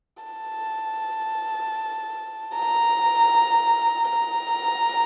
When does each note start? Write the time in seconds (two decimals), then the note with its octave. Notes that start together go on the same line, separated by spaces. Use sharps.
0.23 A5
2.55 A#5
4.09 A#5